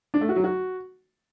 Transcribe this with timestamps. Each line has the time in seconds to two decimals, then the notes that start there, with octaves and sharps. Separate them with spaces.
0.14 D4
0.21 A3
0.29 F#4
0.36 F#3
0.44 F#4